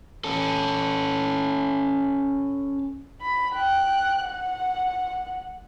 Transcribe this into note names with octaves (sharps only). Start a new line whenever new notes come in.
C#4 A4
B5
G5 F#6
F#5